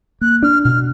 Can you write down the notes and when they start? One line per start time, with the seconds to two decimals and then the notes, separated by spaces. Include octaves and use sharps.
0.21 A#3 F#6
0.43 D4 F6
0.64 B2 F6